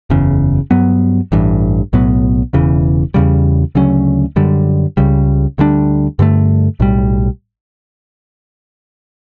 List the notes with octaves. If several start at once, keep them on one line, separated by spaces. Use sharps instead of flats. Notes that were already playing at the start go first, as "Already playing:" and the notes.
F#1 E2 C#3
G2 F#3 B3
A1 G2 E3
B1 A2 F#3 B3
E1 E2 C#3 E3
E2 C#3 G3
D2 C#3 F#3 C#4
F#2 D3 G3
C#2 C#3 G3
D2 D3 G3 D4
G2 D3 A3
B1 A2 G3